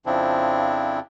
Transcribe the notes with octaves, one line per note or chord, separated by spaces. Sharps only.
F2 C#3 F3 C4 D4 E4